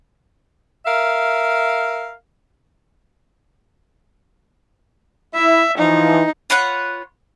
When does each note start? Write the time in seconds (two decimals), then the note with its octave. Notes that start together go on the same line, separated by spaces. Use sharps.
0.86 A#4 E5 F5
5.35 E4 E5
5.78 E3 F3 D#4
6.50 F4 B4 C#5 F#5